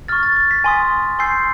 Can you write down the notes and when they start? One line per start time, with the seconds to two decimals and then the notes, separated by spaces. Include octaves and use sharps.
0.08 C#6 F6 A6
0.23 A6
0.36 A6
0.51 B6
0.64 G#5 C6 D#6
1.19 G#5 C6 E6 G6 C7